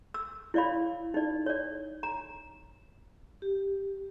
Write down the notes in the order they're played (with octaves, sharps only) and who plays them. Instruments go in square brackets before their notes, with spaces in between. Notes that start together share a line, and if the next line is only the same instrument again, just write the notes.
[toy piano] E6
E4 C#5 D5 F5 B5
D#4 D5
C#5 D5
A#5
[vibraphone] G4